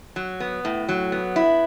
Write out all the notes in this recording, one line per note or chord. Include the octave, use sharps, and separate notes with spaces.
F#3
B3
A2
F#3
B3
E4